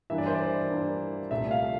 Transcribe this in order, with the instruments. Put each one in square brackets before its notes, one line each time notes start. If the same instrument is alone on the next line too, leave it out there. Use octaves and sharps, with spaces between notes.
[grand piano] G2 E3 A#3 D4 E5
D5
C5
D5
G2 E3 A#3 D4
C2 A#2 A3 E5
F5